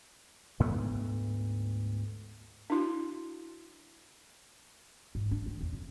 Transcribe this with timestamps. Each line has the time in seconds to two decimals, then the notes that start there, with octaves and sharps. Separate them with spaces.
0.60 D2 G#2 A3 B3
2.70 D4 E4 F#4
5.15 G#2
5.31 D4
5.46 D#3
5.61 E2
5.73 F2